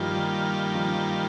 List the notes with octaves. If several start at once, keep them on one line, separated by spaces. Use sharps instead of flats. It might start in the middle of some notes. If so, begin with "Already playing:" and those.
Already playing: G2 D#3 F3 G3 A#3 F4
F3